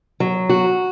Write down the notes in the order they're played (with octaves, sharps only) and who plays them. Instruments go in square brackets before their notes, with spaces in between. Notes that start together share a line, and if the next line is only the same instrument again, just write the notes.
[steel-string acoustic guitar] F#3
F#4